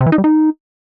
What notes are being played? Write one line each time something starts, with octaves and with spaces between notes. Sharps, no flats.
C3
E3
D#4
G3
D#4